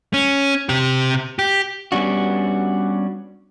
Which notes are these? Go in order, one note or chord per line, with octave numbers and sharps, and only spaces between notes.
C#4
C3 G4
G4
G3 B3 C#4 D4 F#4